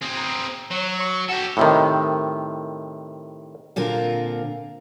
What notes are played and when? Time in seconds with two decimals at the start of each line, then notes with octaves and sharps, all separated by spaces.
0.01 C4 G#4
0.17 A#5
0.71 F#3 C#5
1.00 C#6
1.29 F#4 G4 A4
1.57 A2 C3 D#3
3.76 A#2 D3 C4 F4 A#4